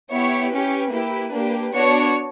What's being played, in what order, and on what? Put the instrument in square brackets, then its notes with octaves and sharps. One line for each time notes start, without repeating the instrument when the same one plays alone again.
[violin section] B3 E4 G4 C#5
C#4 G4 B4
A#3 E4 G4
A#3 D4 G4
B3 D4 F#4 C#5